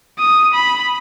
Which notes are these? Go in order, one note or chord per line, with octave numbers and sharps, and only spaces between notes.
D#6
B5